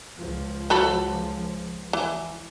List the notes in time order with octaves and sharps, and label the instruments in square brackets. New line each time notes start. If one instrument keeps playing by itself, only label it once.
[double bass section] C#2 F3
[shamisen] F#3 A4 B5
E3